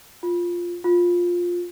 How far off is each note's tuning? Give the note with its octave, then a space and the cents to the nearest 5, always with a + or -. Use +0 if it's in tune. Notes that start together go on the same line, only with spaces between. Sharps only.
F4 +0
F4 +10